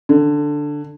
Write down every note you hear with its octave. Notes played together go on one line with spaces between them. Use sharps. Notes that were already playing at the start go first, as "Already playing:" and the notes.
D3